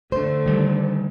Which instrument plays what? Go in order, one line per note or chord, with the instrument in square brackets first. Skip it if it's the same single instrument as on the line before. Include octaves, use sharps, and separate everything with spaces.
[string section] D3 A3 [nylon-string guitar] C5
[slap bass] D#3 G3